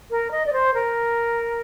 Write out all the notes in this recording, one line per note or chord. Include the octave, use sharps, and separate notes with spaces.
A#4
D#5
D5
C5
A#4